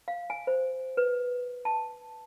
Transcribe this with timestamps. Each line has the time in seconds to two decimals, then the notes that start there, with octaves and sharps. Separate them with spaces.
0.08 F5
0.30 G#5
0.47 C5
0.97 B4
1.65 A5